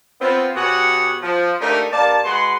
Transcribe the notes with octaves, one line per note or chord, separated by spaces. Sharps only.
B3 C4 F4
B2 G4 G#4 C#5 F#5
F3
A3 A#3 D4 D#4 G4 A#4
G2 A#3 D5 A5
G#3 F#4 B4 F#5 C6